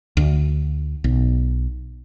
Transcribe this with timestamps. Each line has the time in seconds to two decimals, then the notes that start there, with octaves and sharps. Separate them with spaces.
0.17 D2
1.04 B1